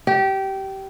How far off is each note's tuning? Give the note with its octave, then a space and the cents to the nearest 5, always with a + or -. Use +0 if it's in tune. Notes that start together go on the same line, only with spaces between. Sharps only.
G4 -20